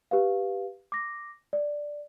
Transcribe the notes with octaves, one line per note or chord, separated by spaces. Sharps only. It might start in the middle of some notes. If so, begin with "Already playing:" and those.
G4 B4 F5
D6 A#6
D5